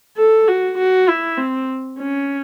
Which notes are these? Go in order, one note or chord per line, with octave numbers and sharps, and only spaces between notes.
A4
F#4
F#4
E4
C4
C#4